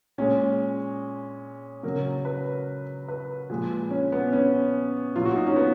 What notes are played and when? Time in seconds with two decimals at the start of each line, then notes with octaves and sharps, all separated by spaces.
0.18 A#2 G#3 C#4
1.83 C#3 F#3 A#4
2.25 B4
3.08 B4
3.50 A#2 F3 G#3
3.91 C#4
4.12 B3
4.33 C#4
5.15 A#2 F#3 F4
5.25 F#4
5.36 D#4
5.47 C#4
5.56 B3